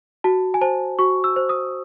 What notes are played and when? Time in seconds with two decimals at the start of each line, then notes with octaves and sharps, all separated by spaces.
0.24 F#4 A5
0.54 G#5
0.61 C5 A5
0.99 F#4 C#6
1.24 E6
1.36 C5
1.49 D#6